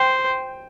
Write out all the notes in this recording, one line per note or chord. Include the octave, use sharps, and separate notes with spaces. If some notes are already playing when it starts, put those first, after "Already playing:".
Already playing: C5 G5